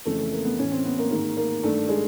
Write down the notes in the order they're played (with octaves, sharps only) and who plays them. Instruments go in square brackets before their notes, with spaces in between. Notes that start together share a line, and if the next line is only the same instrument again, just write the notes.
[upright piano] F2 C#3 E3 A3
A3
A#3
B3
A2 E3 C#4
C4
B3
A#3
G#2 D#3 A#3
A#3
G2 D#3 A3
G#3